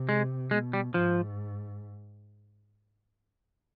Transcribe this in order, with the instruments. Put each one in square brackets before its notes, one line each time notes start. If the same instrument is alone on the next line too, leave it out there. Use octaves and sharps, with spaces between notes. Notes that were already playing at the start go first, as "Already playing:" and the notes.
Already playing: [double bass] C3
[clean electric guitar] G#3
[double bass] B2 [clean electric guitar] G#3
[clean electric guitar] G3
[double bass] G#2 [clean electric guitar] F3